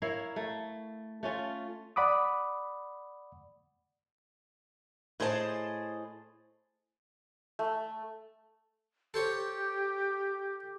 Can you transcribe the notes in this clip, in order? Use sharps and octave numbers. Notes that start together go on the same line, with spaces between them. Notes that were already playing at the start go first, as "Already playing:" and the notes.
E4 A#4 C#5 F5
A3
A3 C#4 F4
D5 F#5 B5 D6 D#6
A2 G#4 C5 D#5 E5 A5
A3
G4 A4 C5 C#5